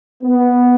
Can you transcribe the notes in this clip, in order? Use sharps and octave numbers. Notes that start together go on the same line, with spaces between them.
B3